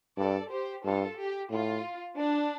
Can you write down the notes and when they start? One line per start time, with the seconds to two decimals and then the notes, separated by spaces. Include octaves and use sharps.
0.17 G2 A4 D5
0.51 G4 C5
0.84 G2 F4 A4
1.18 G4
1.50 A2 F4
2.17 D4